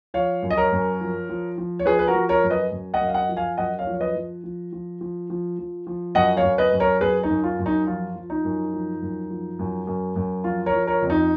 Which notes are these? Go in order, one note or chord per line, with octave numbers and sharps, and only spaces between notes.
F3 C#5 F5
F#2
D#5
A#4 C#5
F#2
F3
F3
F3
C#5
F3 G#4 B4
B4
F#4 A#4
F3
A#4 C#5
F#2
B4 D#5
F#2
D#5 F#5
F#2
F5
D#5 F#5
F3
F5 G#5
F#2 D#5 F#5
C#5 F5
F3
C#5
B4 D#5
F3
F3
F3
F3
F3
F3
F3
F#2 D#5 F#5
C#5 F5
F#2
B4 D#5
F#2
A#4 C#5
F#2 G#4 B4
D#4
F#2
F4
F#2
D#4
F3 F4
F3
D#4
F#2
F3
F#2
F3
F#2
F#2
F#2
F3 F4
A#4 C#5
F3
A#4 C#5
F2
D#4